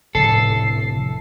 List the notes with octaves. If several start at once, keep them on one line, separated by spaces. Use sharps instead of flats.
F1 A2 D3 A4 C7